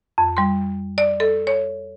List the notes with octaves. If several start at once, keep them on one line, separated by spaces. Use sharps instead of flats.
F2
G3 C6
D5
A4
C#5